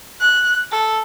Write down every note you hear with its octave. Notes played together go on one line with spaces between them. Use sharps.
F#6
A4